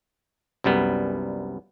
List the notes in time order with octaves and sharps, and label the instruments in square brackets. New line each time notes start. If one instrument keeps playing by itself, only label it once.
[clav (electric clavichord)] C2 F#2 G3 B3